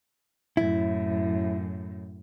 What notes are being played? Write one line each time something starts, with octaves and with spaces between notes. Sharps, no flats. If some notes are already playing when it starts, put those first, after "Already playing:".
F#2 A2 E4